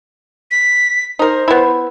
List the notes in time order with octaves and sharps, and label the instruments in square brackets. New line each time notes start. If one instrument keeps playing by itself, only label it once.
[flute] B6
[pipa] D#4 A#4 [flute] C5
[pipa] B3 E4